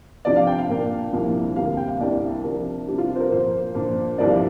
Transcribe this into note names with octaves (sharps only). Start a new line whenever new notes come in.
C3 F3 D4 D5
F5
G5
F5
A#2 A#3 D4
C2 A#2 F3 A#3 D4
D2 C3 G3 A#3 F5
G5
F5
C2 C3 A#3 D4 D5
C3 F3 D4 A#4
C3 G3 D4 G4
F4
C5
A#4
A#2 F3 A#3 C5
A#2 F3 D4
C2 C3 F3 A#3 D4 D5
F5